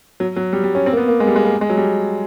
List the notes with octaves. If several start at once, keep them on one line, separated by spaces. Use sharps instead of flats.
F#3
F#3
G3
G3
C#4
C4
A#3
B3
A#3
G#3
G3
G#3
A#3
G#3
F#3
G3